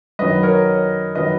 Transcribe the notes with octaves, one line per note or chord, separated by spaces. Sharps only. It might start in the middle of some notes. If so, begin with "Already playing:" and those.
F#2 D#3 F#3 B4 D#5
A#4 C#5
D#3 F#3 B4 D#5